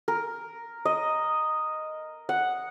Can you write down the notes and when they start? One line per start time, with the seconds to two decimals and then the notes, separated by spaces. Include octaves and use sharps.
0.08 A#4
0.85 D#5
2.29 F#5